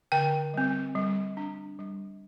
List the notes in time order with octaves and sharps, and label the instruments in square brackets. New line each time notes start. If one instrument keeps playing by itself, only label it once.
[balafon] D3 G5
G3 C4
G3
D4
G3